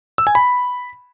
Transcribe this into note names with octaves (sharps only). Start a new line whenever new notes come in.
E6
G#5
B5